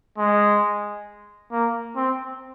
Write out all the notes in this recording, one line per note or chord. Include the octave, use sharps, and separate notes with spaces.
G#3
A#3
C4